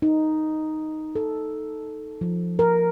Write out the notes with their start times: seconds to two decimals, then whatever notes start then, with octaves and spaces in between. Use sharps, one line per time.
0.02 D#4
1.15 A4
2.21 F3
2.59 A#4